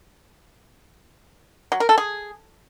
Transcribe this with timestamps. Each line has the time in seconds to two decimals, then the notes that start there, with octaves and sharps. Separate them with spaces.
1.72 F#3
1.80 A#4
1.89 A4
1.98 G#4